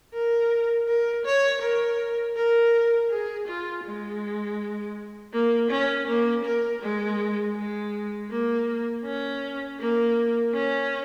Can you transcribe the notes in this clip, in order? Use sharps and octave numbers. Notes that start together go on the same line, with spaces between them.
A#4
A#4
C#5
A#4
A#4
G#4
F4
G#3
A#3
C#4
A#3
A#4
G#3
G#3
A#3
C#4
A#3
C#4